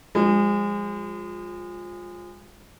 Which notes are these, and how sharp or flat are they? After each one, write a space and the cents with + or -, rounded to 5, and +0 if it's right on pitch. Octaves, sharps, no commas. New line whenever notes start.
F3 +20 G#3 -25